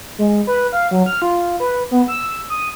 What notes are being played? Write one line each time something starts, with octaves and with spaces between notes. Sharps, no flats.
G#3
B4
F5
F#3
F6
F4
B4
B3
E6
D#6